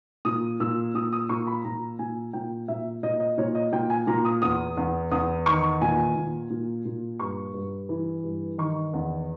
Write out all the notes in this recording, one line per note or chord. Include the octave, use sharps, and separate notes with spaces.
A#2 D#6
A#2 E6
A#2 D#6
D#6
A#2 C#6
B5
A#2 A#5
A#2 G#5
A#2 G5
A#2 E5
A#2 D#5
D#5
A#2 C#5
D#5
A#2 G5
G#5
A#2 A#5
D#6
E2 D#6
E2
E2 D#6
D#3 C#6
A#2 G#5
A#2
A#2
A#2
G2 C#6
G2
E3
G2
D#3 C#6
E2